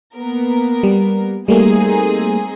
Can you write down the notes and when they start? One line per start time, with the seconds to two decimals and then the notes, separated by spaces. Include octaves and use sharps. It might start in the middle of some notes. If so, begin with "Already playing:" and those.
0.15 A#3 B3 A#4
0.83 G3
1.48 G3 A3 A#3 C4 D#4 G#4